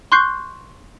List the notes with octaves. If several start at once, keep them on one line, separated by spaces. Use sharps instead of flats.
C6 C#6 F#6 G6 C7